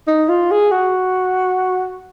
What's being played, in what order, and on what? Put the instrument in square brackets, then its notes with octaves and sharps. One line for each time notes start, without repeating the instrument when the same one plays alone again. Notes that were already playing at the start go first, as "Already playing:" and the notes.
[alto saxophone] D#4
F4
G#4
F#4